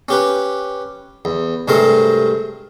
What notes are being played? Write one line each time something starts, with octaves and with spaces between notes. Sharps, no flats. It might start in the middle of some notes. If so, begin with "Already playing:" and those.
C#4 G4 B4
E2
G2 C3 G#3 A3 A#4 C5